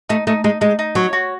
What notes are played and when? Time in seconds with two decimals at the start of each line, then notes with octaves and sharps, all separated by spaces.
0.09 A3 D#4
0.27 A3 D#4
0.44 G#3 D#4
0.61 G#3 D#4
0.79 D#4
0.95 F#3 C#5
1.13 F#4